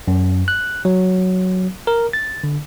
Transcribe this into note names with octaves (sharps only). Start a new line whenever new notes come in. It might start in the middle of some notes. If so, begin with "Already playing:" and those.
F#2
F#6
F#3
A#4
A6
D3